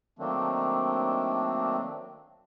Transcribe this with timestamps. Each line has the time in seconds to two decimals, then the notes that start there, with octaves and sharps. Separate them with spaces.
0.19 D#3 F#3 A3 A#3 C4 D4